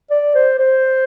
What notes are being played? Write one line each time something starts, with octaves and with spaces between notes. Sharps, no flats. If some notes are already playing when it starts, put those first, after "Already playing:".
D5
C5
C5